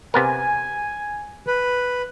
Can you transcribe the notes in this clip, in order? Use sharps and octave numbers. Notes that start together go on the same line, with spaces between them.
C3 B3 A#4 G#5
B4